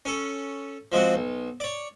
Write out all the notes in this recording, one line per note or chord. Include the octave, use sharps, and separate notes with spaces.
C#4 A4
F3 G#3 C4 F#4
B1
C#5 D5